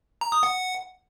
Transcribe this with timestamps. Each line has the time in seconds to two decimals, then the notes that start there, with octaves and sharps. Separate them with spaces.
0.21 A#5
0.32 D#6
0.43 F#5